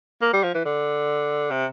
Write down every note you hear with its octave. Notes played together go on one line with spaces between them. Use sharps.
A#3
G3
F3
E3
D3
C3